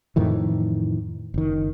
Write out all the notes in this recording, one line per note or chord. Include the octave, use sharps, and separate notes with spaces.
F2 A2 D#3 E3
F#1 D#3